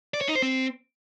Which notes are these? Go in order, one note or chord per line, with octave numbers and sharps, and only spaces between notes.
D5
C#5
D#4
C5
C4